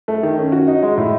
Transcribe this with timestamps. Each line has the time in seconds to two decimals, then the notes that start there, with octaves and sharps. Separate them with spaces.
0.08 A3
0.23 D#3
0.38 C#4
0.52 F#4
0.67 D#4
0.83 G#3
0.98 A2